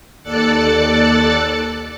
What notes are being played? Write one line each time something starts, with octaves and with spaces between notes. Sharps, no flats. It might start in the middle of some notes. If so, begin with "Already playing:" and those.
D#2 A4 D5 F#6 A6 C#7